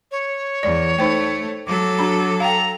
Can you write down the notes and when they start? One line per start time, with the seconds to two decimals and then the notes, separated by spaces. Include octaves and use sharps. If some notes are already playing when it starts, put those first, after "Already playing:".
0.11 C#5
0.63 E2 D5
0.99 A3 D#4 C5 G5
1.67 F#3 A4 D6
1.99 D4 F#4 B5
2.40 F5 G5 A#5